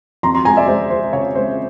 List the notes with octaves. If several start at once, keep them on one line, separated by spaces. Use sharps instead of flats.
F2 A#5 C6
A#5 C6
G#3 G#5 A#5
D5 E5
G#3 C5
G#3 C5
C#3 C#5
G#3 C5